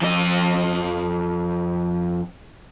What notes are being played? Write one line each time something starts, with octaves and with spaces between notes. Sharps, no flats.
F2 D#5